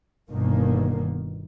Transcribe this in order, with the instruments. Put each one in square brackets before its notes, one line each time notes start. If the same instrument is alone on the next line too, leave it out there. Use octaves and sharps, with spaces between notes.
[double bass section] G1 B2 D#3 A#3